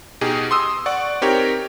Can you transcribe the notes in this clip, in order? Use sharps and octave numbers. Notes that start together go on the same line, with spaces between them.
B2 D#4 G4 G#4
C6 D#6 E6
D5 F#5 C#6
C4 D#4 G4 A#4 C#5